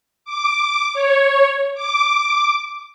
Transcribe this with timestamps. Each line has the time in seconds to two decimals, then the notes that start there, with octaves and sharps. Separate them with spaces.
0.25 D6
0.94 C#5
1.75 D6